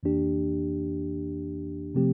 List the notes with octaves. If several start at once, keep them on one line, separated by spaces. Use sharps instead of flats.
F2 E3 A#3 D4 G4
C3 F3 A3 C4 G4